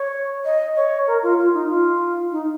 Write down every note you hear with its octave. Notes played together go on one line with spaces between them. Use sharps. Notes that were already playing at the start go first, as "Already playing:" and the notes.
Already playing: C#5
D#5
C#5
A#4
F4
F4
D#4
F4
D#4